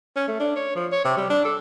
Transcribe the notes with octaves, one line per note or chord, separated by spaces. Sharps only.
C#4
A3
D4
C#5
F3
C#5
C3
G3
D4
A4